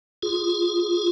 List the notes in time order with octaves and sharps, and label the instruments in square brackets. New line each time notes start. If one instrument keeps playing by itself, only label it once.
[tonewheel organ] F4 G#4